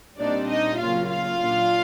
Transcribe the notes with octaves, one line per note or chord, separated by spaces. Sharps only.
A#2 G3 C4 D4 D#4 D5
D#4 D#5
C#3 F#3 A#3 C#4 F4 F5
F4 F5
A#2 F#3 A#3 D4